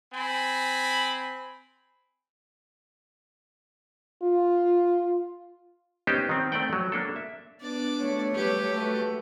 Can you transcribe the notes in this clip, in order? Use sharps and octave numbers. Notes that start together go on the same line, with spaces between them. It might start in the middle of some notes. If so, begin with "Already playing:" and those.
C4 G#5 B5
F4
B3 C#4 D#4 G4 C5 D#5
D#3 C4
A3 C4 D5 F#5 G5
F#3
A#3 D4 A4
E5
B3 D4 D5
A3 C#5
F#3 G3 G4 B4
A3 F#4 B4